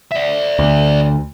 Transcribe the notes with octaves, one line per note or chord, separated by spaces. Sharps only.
D5 E5
D2